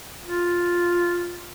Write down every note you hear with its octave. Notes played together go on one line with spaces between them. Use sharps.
F4